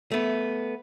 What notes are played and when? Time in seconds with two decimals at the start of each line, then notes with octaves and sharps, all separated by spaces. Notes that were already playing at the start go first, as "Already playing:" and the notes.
0.12 A3 B3